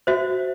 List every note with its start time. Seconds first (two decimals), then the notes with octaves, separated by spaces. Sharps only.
0.07 F#4 C5 E5